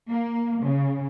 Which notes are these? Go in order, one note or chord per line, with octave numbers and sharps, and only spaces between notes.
A#3
C#3